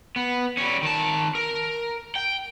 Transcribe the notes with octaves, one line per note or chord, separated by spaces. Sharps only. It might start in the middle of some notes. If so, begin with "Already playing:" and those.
B3
G3 C#4
D#3 A5
A#4
G5